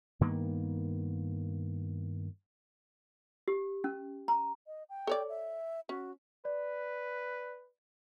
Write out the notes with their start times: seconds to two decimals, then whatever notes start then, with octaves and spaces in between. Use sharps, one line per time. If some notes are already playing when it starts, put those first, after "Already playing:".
0.21 G2 D#3 A#3 B3
3.48 G4
3.84 C#4
4.28 A#5
4.67 D#5
4.89 G5
5.07 A4 C#5 D5
5.29 E5
5.89 C#4 F#4
6.45 B4 D5